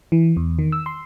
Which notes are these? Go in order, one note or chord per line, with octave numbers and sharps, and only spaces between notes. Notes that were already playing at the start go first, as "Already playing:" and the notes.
E3
E2
D#3
E6
C6